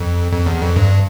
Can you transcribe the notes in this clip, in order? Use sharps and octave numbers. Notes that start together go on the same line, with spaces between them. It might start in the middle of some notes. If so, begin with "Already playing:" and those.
Already playing: F2
F2
E2
F2
G2